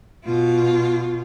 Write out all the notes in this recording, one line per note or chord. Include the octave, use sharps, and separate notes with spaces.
B2 F4